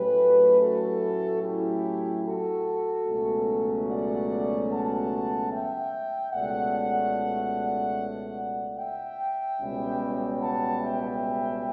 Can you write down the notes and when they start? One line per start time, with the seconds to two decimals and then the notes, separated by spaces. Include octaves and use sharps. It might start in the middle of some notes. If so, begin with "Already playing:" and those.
Already playing: A2 F#3 A3 C#4 G4 B4
0.61 F#4 A4
1.43 E4 G4
2.24 F#4 A4
3.06 C#2 B2 F#3 A3 C#4
3.88 D5 F#5
4.69 F#5 A5
5.51 E5 G5
6.32 C#2 B2 A3 D5 F#5
8.78 E5 G5
9.60 C#2 B2 G3 C#4
10.41 F#5 A5
10.81 E5 G5